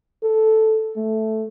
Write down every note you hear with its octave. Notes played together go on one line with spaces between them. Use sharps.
A4
A3